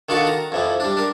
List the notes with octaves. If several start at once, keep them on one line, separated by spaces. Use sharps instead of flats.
D3 D#3 F4 F#4 A5
A#5
F2 E3 F3
G3 D4
D4 A#4